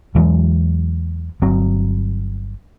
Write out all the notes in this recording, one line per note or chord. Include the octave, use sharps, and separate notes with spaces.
E2 E3 F#3 G#3
G1 F#3 C4